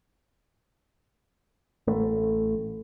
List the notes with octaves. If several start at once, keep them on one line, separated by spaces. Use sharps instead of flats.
A1 A3